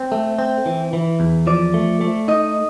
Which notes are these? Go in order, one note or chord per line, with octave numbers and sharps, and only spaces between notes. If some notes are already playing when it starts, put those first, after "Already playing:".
Already playing: C4
A3
C4
E3
E3
E2
F3 D5
A3
A3
D#4 D#5